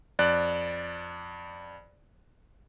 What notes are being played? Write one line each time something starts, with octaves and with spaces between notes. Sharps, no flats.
F2 D5 F#6